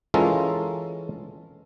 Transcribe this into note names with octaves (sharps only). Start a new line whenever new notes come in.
E3 G#3 C#4 F4 A4 A#4